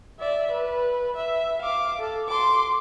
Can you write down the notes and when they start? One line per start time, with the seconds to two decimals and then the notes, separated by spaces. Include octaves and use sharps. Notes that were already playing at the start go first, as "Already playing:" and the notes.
0.20 D5 E5
0.51 B4
1.16 E5
1.61 F5 D6
2.00 A4
2.28 C6 D6